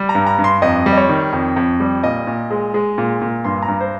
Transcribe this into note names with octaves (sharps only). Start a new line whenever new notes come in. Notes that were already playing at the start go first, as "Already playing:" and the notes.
Already playing: G3
A#5
G2
A#5
G2
C6
F2 D#5
G3
D#5
C#5
D#3
F2
F2
G3
A#2 D#5
A#2
G#3
G#3
A#2
A#2
G2 C6
A#5
G2
C5